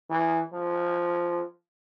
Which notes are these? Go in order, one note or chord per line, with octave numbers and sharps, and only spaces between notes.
E3
F3